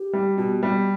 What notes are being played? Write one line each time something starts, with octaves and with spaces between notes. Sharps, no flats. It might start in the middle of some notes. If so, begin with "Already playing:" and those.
Already playing: G4
G3
B2 G4
G3